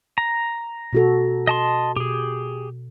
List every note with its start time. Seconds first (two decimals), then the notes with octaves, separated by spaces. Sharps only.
0.18 A#5
0.93 B2 F#4 A4
1.47 D#5 A5 C6
1.96 B2 G4 G#4